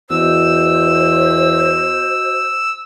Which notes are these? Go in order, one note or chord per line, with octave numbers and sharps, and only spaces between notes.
E2 F#4 C5 D#5 E6